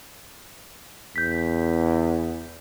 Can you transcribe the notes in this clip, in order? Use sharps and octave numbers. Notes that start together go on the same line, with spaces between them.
E2 G6 B6